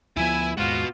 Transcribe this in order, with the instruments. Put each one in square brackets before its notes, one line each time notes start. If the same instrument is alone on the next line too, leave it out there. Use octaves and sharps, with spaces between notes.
[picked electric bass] D2 F3 B3 [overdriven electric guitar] E4 E5 [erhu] G#5
[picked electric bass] D#2 G#2 G#3 [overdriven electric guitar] B3 F#4 [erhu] F4